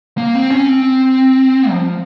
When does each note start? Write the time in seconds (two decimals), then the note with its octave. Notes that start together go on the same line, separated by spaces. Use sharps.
0.18 A#3
0.35 C4
0.51 C#4
0.69 C4
1.70 F3